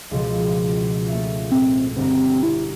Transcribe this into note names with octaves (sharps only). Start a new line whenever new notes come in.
C#2 B2 F3
A3 A#3 E5
A2 C4
G1 C4 A#5
E4